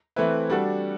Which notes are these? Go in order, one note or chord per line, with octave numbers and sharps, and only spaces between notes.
E3 A3 C4 E4 B4
G3 D4 F#4 A4